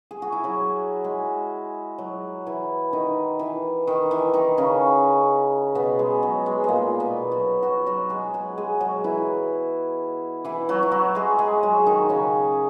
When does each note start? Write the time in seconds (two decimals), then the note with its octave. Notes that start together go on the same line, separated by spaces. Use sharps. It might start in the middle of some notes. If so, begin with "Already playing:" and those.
0.11 G#4
0.22 F#4
0.32 E4
0.44 F#3 F#4
1.04 G#3 G#4
1.98 F#3 F#4
2.46 E3 E4
2.93 D#3 D#4
3.39 E3
3.87 D#3
4.11 E3
4.33 D#3 D#4
4.57 C#3 C#4
5.75 B2 B3
5.99 G#3
6.23 F#3
6.46 G#3
6.64 A#2 G#3 A#3
7.00 B2 B3
7.32 F#3 F#4
7.63 F#3 F#4
7.86 F#3 F#4
8.09 G#3 G#4
8.34 F#3 F#4
8.57 G#3 G#4
8.81 F#3 F#4
9.04 E3 E4
10.45 E3 E4
10.69 F#3 F#4
10.83 E4
10.92 F#3 F#4
11.15 G#3 G#4
11.39 G#3 G#4
11.63 F#3 F#4
11.86 D#3 D#4
12.09 C#3 C#4